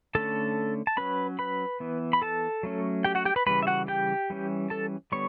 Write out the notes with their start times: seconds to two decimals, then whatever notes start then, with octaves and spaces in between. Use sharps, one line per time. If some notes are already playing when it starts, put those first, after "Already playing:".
0.15 D3 A3 C#4 A4 A5
0.87 A5
0.97 F#3 C#4 B4 B5
1.39 B4 B5
1.80 E3 B3
2.13 B5
2.22 A4 A5
2.63 F#3 A3 C#4
3.04 G4 G5
3.15 F#4 F#5
3.25 G4 G5
3.36 B4 B5
3.46 C#3 E3 G3 B4 B5
3.63 E5
3.67 F#4 F#5
3.88 G4 G5
4.30 E3 G3 C#4
4.70 A4 A5
5.12 D3 G3 B3 C#5 C#6